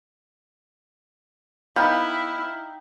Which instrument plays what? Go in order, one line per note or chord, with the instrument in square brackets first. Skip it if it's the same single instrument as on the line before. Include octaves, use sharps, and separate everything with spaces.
[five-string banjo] B3 [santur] D#4 F5 G5 [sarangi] E4